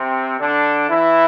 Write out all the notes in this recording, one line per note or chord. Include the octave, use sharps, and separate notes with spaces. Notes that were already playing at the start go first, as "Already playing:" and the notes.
Already playing: C3 C4
D3 D4
E3 E4